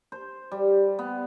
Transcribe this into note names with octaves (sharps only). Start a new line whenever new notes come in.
C5
G3
B3